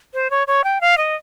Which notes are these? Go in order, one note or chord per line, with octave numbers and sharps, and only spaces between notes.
C5
C#5
C#5
G5
F5
D#5